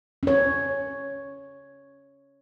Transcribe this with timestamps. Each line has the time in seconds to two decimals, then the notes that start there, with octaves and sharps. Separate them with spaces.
0.23 C#4 C#5